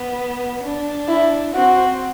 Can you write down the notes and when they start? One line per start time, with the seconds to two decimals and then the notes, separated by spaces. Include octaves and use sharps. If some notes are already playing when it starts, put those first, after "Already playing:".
Already playing: B3
0.63 D4
1.08 E4
1.54 C4 F#4